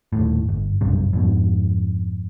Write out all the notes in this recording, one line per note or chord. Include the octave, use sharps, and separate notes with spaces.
D#1 D#2 A2
G1
F#1 B1 G2 C3
F2 G#2 B2